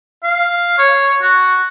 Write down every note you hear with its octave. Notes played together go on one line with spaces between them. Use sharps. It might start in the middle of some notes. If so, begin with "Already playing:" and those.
F5
C#5
F#4